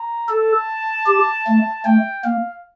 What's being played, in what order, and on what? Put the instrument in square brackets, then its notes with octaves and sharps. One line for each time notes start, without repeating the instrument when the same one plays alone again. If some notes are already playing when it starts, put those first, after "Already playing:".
Already playing: [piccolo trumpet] A#5
[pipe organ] A4 [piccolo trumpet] A5
[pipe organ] G4
A3
[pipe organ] A3 [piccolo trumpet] G5
[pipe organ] A#3 [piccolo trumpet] F5